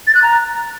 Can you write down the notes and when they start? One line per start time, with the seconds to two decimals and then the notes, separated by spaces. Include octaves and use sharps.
0.07 A6
0.15 F#6
0.23 A#5